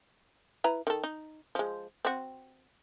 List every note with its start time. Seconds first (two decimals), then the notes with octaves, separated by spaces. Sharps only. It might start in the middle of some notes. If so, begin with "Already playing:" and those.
0.64 E4 B4 A#5
0.87 D#3 A4
1.04 D#4
1.55 F3 G#3
2.05 C4 F#4